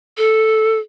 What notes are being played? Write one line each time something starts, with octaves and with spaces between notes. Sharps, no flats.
A4